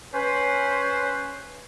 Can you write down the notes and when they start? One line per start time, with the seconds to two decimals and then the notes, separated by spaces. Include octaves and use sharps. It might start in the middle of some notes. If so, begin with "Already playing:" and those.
0.14 C#4 B4 C5